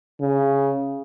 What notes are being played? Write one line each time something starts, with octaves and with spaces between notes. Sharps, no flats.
C#3